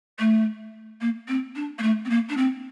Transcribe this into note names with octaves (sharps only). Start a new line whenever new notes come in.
A3
A#3
C4
D4
A#3
A3
C4
A#3
D4
C4